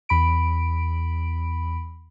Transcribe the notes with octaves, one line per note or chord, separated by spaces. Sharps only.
E2 B5 D7